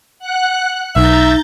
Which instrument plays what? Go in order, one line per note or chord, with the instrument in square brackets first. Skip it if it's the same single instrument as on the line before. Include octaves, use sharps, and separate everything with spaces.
[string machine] F#5 F#6
[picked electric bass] B1 [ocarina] D#4 [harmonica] E5 [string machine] A#5 G6 A6